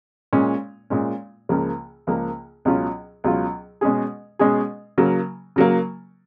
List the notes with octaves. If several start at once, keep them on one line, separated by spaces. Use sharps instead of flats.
A#2 G#3 C#4
A#2 G#3 C#4
C#2 C#3 F3 A#3
C#2 C#3 F3 A#3
C#2 B2 F#3 C#4 F4
C#2 B2 F#3 C#4 F4
B2 G#3 C#4 G#4
B2 G#3 C#4 G#4
C#3 F#3 A#3
C#3 F#3 A#3